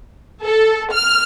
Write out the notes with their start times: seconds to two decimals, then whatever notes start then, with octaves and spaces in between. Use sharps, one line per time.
0.43 A4
0.93 F6